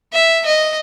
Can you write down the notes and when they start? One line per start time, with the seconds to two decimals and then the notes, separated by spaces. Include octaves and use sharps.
0.13 E5
0.46 D#5